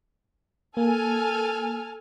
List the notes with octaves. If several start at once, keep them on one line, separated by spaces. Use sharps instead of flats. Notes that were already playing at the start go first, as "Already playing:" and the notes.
A#3 A4 G#5 F6